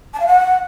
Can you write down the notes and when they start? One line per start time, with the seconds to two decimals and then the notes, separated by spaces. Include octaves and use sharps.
0.14 A5
0.20 F5
0.26 F#5